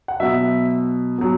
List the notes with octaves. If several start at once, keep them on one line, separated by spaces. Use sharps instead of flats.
F#5
B2 F#3 E5
B2 F#3